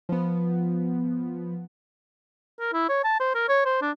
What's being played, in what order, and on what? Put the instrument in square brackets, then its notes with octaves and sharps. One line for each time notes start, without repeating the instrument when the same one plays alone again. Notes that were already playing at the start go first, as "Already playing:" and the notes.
[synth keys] F3 B3
[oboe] A#4
E4
C#5
A5
C5
A#4
C#5
C5
D4